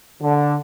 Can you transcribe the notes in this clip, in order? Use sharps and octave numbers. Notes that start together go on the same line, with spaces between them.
D3